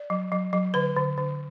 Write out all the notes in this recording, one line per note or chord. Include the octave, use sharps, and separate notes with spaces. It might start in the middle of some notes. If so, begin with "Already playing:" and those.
Already playing: D5
F#3
F#3
F#3
D3 B4
D3
D3